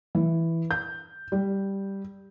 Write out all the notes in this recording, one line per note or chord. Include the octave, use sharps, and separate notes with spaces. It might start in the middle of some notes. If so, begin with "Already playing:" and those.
E3
G6
G3